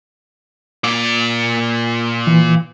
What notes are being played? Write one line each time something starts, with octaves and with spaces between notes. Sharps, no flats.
A#2 D5
E3